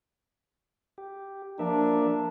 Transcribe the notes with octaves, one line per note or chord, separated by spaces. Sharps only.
G4
F3 A#3 D4 A#4 E5